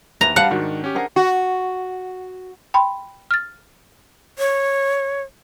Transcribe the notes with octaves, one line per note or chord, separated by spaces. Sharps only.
D#2 B4 E5 A#5
G3 B4 F5 F#5 A5
G#2 D#3 D4 F#4
C#4 G4
D4 G#4 A#4 C5 F#5 A#5
F#4
G5 B5 C6
F6 A6
C#5